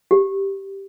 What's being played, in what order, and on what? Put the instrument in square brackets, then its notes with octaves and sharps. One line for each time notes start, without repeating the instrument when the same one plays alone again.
[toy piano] G4